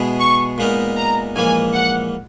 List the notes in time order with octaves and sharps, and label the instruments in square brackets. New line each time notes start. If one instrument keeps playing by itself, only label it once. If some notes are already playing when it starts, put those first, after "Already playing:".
Already playing: [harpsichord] B2 G#3 B3 E4 G#4
[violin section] C#6
[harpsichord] A#2 G#3 B3 D#4 A#4
[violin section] A#5
[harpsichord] A#1 G#2 E3 A#3 [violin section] G#5
[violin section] F#5